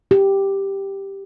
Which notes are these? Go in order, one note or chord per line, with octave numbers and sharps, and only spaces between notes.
G4